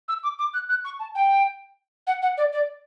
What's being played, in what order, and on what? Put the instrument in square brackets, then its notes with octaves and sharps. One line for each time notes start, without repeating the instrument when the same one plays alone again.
[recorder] E6
D6
D6
F#6
F#6
C#6
A5
G5
F#5
F#5
D5
D5